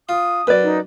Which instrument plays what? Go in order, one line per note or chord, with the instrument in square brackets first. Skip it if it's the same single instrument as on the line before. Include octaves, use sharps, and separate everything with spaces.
[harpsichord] F4 [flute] D#6
[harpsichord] F#2 [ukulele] B4 D5
[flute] D#4